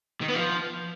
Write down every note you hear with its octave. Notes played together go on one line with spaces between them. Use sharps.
D#3
B3
F3